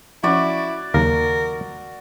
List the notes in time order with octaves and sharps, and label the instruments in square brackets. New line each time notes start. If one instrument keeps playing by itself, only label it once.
[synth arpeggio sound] F3 C#4 [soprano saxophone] E4 [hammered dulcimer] F#4 D5
[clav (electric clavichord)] D#2 F5 A#5 [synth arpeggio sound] C#3 F#3 [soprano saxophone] A#4